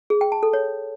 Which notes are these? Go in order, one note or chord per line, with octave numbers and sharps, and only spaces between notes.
G#4
G5
A5
A4
C#5